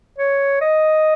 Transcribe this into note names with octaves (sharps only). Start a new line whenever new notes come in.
C#5
D#5